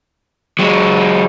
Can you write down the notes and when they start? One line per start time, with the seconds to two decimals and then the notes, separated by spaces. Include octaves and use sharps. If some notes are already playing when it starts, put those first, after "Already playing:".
0.59 F#3 G#3